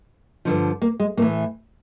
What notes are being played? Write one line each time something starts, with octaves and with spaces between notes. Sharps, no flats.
G2 D3 F3
A#3
G#3
A2 E3 A#3